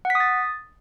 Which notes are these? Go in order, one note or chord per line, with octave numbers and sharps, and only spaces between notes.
F#5
B6
D#6
A6